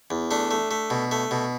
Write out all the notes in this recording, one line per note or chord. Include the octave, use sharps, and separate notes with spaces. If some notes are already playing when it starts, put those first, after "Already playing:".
E2
A3 D4
A3
A3
B2
A3
B2